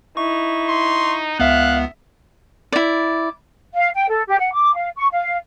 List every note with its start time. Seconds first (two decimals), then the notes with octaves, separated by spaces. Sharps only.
0.17 D#4 E4 C#6
0.69 C6
1.40 C#2 B3 E5 F5 F#6
2.72 E4 D5
3.74 F5
3.95 G5
4.09 A4
4.28 G4
4.39 F#5
4.54 D6
4.75 F5
4.97 C#6
5.12 F5